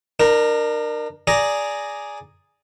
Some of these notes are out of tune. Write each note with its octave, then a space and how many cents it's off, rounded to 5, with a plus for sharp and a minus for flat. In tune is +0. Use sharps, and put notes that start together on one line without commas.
D4 +40 A#4 +0
G#4 +0 D5 -5 A#5 +0